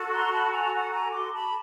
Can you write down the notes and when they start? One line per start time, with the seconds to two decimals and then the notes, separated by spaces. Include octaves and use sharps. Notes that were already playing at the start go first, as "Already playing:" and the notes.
Already playing: F#4 A4
0.12 A#5 C6
0.32 A5 B5
0.52 G#5 A#5
0.72 F#5 G#5
0.93 G#5 A#5
1.12 C6 D6
1.32 A5 B5